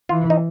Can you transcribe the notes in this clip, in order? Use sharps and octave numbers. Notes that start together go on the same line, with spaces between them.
E3 F4
D#4